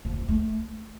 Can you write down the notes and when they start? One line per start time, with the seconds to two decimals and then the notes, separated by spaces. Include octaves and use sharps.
0.05 F3
0.13 F4
0.21 C4
0.29 A3